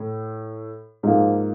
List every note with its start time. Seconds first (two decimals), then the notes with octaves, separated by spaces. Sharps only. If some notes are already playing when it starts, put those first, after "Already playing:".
Already playing: A2
1.03 G#2 F3 A#3